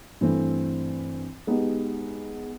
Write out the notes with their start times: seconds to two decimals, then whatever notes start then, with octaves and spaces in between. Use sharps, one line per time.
0.21 G2 E3 A3 C4
1.47 G#3 B3 D#4 G4